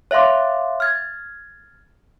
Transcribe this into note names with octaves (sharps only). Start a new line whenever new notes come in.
C#5 E5 F5 C6 D6
F6 G#6 A6